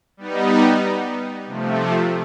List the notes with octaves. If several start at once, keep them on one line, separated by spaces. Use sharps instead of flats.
G3 B3 D#4
C3 F3 A3